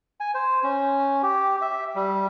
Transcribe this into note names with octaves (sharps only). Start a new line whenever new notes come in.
G#5
C5
C#4
G4
E5
G3